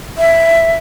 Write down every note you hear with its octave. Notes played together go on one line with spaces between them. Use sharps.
E5